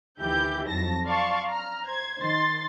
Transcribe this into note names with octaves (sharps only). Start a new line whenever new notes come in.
D2 D#3 E3 E4 G4 G6
F2 F#3 A5 A#6
D5 F5 A5 C6 C#6
A#5 F6
C5 G#6
D#3 C6 A6